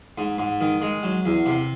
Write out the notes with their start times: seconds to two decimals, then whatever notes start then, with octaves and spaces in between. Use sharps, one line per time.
0.18 G#2
0.38 G#2
0.61 D#3
0.82 G#3
1.03 F#3
1.25 E2
1.46 C3